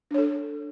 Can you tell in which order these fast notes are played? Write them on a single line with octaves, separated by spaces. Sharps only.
D4 C#5 A4